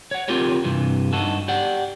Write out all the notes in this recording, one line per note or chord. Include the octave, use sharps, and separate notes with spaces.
C#5 F#5
C4 F4 G4 A#4 C#5
G2 C3 E3
G2 D#4 F#4 A4
G4 D5 F#5